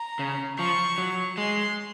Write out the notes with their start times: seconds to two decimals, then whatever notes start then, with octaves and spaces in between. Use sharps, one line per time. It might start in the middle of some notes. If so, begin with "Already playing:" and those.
Already playing: A#5
0.19 C#3
0.59 F3 C#6
0.98 F#3
1.38 G#3 C6